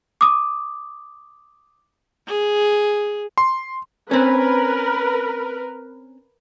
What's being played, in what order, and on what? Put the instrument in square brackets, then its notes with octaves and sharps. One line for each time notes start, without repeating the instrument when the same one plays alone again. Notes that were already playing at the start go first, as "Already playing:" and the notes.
[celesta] D6 D#6
[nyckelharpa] G#4
[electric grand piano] C6
[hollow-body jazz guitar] C4 C#4 [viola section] A#4 B4